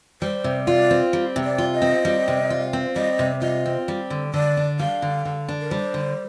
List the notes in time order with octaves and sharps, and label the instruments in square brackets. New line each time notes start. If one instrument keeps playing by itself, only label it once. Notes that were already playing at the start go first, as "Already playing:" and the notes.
[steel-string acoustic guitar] G3 [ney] C5
[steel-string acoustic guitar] C3
[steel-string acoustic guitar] F4 [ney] D5
[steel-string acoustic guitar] C4
G3
C3
[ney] D5
[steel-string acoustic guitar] F4
[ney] D#5
[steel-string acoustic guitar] C4
G3
C3
F4
C4
[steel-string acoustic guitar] G3 [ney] D#5
[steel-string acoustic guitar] C3
[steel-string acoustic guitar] F4 [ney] D#5
[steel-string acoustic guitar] C4
G3
D3
[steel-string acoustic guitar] D3 [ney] D5
[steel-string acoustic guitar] D4
[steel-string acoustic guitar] G3 [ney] F5
[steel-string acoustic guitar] D3
D3
D4
[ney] A#4
[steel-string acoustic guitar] G3 [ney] C5
[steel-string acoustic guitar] D3